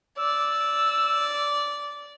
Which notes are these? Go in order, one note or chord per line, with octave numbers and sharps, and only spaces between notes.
D5 E6